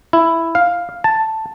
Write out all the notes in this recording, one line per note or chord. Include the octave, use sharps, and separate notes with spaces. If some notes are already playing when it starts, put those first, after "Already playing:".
E4
F5
A5